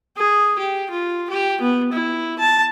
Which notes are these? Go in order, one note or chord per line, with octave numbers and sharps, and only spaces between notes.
G#4
G4
F4
G4
B3
E4
A5